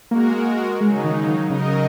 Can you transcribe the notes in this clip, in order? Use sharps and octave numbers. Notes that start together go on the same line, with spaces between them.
G#3 A#3 F#4 A#4
C#3 F#3 G#3 D#4
D#3
D#3
C#3 F#3 D#4 A#4 D#5